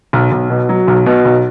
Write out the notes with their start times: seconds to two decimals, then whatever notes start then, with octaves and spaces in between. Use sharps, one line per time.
0.13 B1
0.32 B1
0.50 B2
0.69 F#3
0.88 B1
1.06 B2
1.25 B1